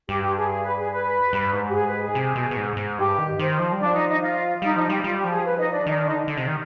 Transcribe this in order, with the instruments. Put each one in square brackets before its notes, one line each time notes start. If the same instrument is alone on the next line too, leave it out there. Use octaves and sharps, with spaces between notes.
[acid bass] G2 [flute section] G4
[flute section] G4
G#4
G#4
B4
G#4
B4
[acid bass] G2
G#2
[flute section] G4
G#4
B4
G#4
[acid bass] C3
B2
B2
G#2
G#2
[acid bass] G2 [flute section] G4
[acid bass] D#3
[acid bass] D#3 [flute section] C5
[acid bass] F3
G3
[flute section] D4 D5
[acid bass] F3
[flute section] D#4 D#5
D#4 D#5
F4 F5
[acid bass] G3 [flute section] D#4 D#5
[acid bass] F3 [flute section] D#4 D#5
[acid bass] G3 [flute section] G4
[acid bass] G3 [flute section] F4
[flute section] G4
[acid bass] F3
[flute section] G#4
B4
D#4 D#5
D4 D5
[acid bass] D#3 [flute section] D#4 D#5
[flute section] D4 D5
[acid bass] D3 [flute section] D#4 D#5
[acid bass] D3
C3
D#3